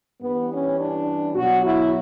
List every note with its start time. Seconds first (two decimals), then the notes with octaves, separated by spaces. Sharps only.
0.22 G2 E3 G3 B3
0.51 C#4
0.79 D4
1.35 B2 F#3 F#4
1.64 E4